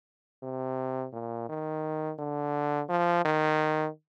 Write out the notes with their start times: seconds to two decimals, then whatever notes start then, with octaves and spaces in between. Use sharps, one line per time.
0.43 C3
1.13 A#2
1.49 D#3
2.19 D3
2.89 F3
3.25 D#3